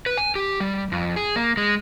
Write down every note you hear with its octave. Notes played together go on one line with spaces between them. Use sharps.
B4
G#5
G4
G3
F2
G#4
A#3
G#3